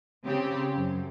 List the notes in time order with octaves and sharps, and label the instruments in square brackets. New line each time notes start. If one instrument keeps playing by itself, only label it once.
[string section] C#3 C4 G4
F#2